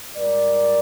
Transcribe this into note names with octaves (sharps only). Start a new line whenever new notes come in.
G#2 G3 A#4 D5